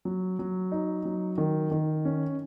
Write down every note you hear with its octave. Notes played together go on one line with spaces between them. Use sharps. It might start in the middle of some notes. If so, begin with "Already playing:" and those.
F#3
F#3
D#4
F#3
D#3
D#3
C#4